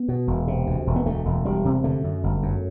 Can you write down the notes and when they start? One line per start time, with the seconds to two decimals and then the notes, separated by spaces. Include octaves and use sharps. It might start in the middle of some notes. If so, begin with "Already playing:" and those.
Already playing: B3
0.08 B2
0.27 E1
0.48 C3
0.67 D2
0.87 E1
0.96 B3
1.06 D2 A3
1.25 E1
1.45 E1 G3
1.65 C3
1.84 D3 A3
2.04 F#2
2.24 G1
2.43 F#2